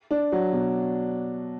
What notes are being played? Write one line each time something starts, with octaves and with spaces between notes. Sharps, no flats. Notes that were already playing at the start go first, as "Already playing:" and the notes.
D4
F#3
B2